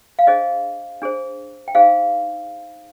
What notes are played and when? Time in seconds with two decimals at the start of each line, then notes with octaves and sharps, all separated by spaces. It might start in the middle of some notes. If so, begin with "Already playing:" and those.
0.19 F5
0.27 D4 G#4 C5 D#5
1.02 D4 G#4 C5
1.68 G5
1.75 D#4 G#4 C5 F5